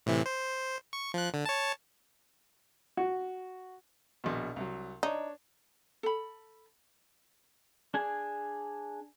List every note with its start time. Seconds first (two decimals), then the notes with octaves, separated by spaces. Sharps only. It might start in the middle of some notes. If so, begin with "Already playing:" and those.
0.06 A2 C3 E3
0.26 C5
0.93 C#6
1.14 F3 F#6
1.34 D3
1.46 C#5 A5
2.97 F#4
4.24 A#1 B2
4.56 C2 F#3
5.03 D4 D#4 C#5
6.03 A4 B5
7.94 D4 G#4 G#5